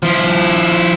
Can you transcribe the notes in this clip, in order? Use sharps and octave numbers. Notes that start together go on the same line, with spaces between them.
F3 E4